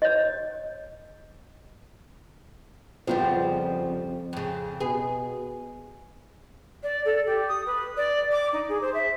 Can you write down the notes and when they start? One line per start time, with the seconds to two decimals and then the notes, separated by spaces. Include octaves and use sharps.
0.02 C#5 D#5
3.07 F2 C#3 F3 G3 B3 F4 C5
4.33 F2 C#3
4.80 B2 G#4 B4
6.83 D5
7.05 A4
7.26 G4
7.48 D#6
7.66 B4
7.97 D5
8.31 D6
8.53 D#4
8.69 G#4
8.81 C5
8.94 E5